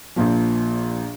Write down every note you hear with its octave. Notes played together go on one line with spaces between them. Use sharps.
A#1 A#2 F3